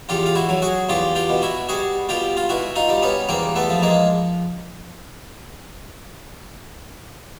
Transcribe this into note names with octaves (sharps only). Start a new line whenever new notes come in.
E2 F4 G4
F4
E4 F#4
F#3
F#4 G#4
E2 F4 G4
F4 G4
B2
E4 F#4
G3 F#4 G#4
B2 F4 G4
F4
B2 E4 F#4
D#4 F4
G3
B3 C#4
E2 A#3 C4
A3 B3
F3
G#3 A#3